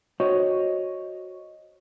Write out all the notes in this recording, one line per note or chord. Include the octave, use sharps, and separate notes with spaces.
F#4 C5 C#5 D#5